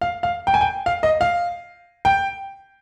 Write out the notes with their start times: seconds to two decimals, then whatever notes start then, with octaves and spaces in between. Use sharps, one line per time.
0.01 F5
0.23 F5
0.47 G5
0.54 G#5
0.61 G5
0.86 F5
1.03 D#5
1.21 F5
2.05 G5